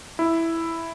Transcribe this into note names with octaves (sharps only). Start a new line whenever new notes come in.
E4